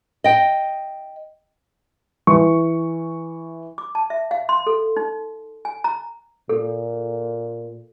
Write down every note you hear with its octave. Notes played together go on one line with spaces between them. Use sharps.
D#5 G5
E3 C#6
D6
A5
E5
F5
C6
A4
D#4
G#5
A#5
A#2 A4